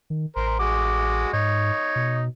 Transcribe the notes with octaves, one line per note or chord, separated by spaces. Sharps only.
D#3
A1 A#4 C5
G#3 F#4 D6
G#2 D#4 C#5
B2